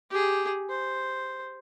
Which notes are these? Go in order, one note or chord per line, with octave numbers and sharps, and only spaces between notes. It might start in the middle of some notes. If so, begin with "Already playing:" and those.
G4 G#4
C5